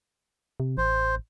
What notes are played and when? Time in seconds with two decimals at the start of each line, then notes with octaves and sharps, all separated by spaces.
0.60 C3
0.78 A1 C5